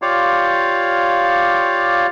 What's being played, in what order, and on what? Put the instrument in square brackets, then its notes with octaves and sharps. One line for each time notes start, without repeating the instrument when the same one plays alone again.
[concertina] F4 G4 C#5 D5 F5